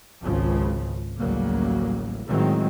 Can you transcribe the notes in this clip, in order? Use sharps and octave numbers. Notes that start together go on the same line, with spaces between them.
G#1 C#2 C#3 F3
A1 D2 C#3 F#3 G3 A#3
A1 D#3 E3 F#3 G#3 C4